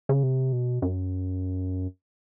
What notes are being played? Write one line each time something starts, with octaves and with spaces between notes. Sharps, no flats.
C#3
C3
B2
F#2